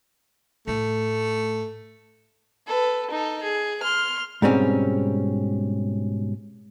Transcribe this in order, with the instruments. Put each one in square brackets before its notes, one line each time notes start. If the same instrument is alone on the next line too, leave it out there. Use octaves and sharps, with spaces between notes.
[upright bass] A2 [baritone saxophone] A3
[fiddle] A4 B4
D#4 A4
G#4
C6 F6
[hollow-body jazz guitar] G#2 B2 G3 C4 C#4